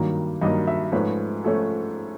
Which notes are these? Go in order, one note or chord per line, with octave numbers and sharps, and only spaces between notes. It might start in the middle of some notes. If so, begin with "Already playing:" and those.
Already playing: G2 D#3 F#3 A#3
G2 D#3 F#3 A#3 D#5
E5
G#2 F3 A3 C#4 B4
F3 A3 C#4 A4